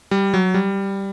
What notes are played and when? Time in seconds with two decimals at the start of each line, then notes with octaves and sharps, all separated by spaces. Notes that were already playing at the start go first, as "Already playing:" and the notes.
0.11 G3
0.34 F#3
0.54 G3